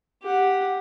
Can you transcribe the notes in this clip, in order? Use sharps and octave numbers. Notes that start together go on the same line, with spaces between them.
G4 F#5